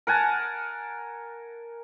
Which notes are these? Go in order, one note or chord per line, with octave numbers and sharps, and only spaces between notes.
A#4 F#5 G#5 A5